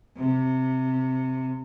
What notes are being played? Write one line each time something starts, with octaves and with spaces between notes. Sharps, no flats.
C3